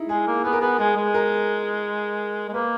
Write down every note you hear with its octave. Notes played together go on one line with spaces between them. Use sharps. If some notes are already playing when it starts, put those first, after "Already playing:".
Already playing: D#4 E4
G#3 G#4
A#3
B3 G#4
A#4
B3 G#4
G#3 G#4
G#3
A#4
G#3
A#3 B4